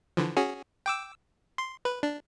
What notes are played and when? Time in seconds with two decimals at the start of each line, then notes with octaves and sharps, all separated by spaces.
0.17 D3 E3 F3
0.37 C#4 F#4 G#4
0.86 G5 D6 E6
1.58 C6
1.85 B4
2.03 D4